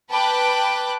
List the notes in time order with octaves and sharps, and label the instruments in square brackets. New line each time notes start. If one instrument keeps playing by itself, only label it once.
[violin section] B4 G5 A5 B5 D6 F#6